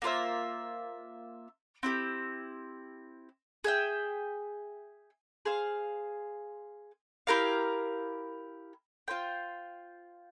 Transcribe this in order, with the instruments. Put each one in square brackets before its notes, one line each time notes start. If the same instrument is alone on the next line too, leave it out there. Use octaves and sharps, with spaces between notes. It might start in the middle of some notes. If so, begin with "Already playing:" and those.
[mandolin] A#3 F4 C5 E5
C4 E4 G4
G#4 E5 G5
G#4 C5 F5
E4 G4 A#4 F5
F4 C5 G5